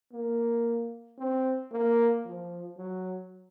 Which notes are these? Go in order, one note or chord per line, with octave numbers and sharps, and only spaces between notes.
A#3
C4
A#3
F3
F#3